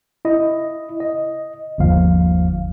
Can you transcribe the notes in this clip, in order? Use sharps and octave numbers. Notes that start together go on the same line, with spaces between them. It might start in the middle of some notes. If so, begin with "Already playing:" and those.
E4 D#5
D#5
G1 D#2 F3 F5